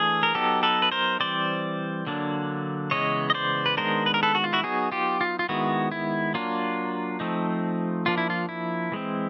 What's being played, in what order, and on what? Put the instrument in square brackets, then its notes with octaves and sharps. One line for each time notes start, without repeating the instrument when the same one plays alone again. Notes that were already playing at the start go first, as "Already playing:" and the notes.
Already playing: [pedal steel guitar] E3 A3 D4 G#4
A#4
F#3 B3 D#4 G4 A4
A4 B4
B4
A#4 C5
E3 G3 C4 C5 D5
D3 F#3 A#3 D4
C#3 E3 G#3 B3 C#5 D#5
D#5
C5 D5
B4
D#3 G#3 B3 D4 A#4 C5
B4
A#4
A4 B4
F#4
F4
E4 F#4
F#3 B3 D#4 F#4 G#4
F4 G4
F4
F4
D#3 G#3 B3 E4 F#4
E4
F#3 A#3 D4 F4
F3 A3 C4 D#4
F3 A#3 D4 F4
E4
F4
E4
E3 G#3 C4